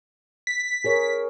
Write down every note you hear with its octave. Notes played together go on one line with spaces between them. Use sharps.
B6
G#4 A#4 C#5